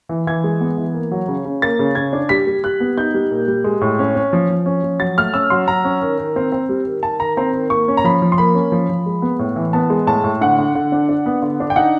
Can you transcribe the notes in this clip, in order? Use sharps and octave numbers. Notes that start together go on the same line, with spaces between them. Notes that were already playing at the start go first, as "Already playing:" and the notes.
E3
E3 G#6
G#3
B3
E3
A#3
F#3
C#3
C#3
A#3 A6
C#3
C#3 G#6
D4
G3 B6
G3
G3 F#6
B3
D#4 G6
G3
A#2
G3
G#3
A2
C#4
C#4
F3
F3
C#4
F3
F#3 A6
A3 F6
C#4 E6
F#3 C6
F#3 A#5
C#4
D#3
D#3
C4
C4
G3
D#3
D#3 A5
D#3 A#5
C4 A#5
D#3
A#3 C#6
C#4
A#5
F3 B5
F3
C6
A#3 B5
C#4
F3
F3
G#3
B3
A2
E3
B3 A5
G#3
A2 A5
A2
D3 F#5
D3
D3
D4
D4
B3
D3
D4
G5
D#4 F#5